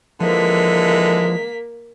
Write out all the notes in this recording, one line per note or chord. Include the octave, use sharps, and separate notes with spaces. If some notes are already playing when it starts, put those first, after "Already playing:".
D3 E3 F3 G#3 A#3 B6